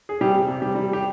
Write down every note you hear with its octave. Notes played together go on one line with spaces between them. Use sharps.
G#4
C3 G3 G4
C3
G3 G4
G3
G4